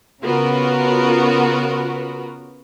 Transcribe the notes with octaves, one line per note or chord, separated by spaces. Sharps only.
C#3 B3 F4 F#4 A#4